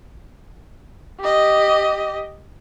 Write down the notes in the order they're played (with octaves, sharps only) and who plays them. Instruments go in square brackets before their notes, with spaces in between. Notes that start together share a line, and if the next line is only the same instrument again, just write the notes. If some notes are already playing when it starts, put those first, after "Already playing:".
[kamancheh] G4 D#5